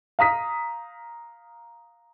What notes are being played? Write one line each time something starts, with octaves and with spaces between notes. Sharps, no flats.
F5 A#5 D#6 B6